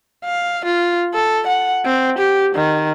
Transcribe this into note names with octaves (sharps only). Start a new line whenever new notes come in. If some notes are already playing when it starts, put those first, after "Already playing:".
F5
F4
A4
F#5
C4
G4
D#3